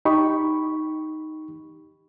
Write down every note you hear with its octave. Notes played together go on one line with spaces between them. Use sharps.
D#4 G4 B5 C#6